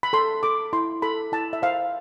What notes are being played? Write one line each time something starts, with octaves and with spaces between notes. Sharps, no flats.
B5
A4 C6
A4 D6
E4 C6
A4 B5
E4 A5
E5
C5 F5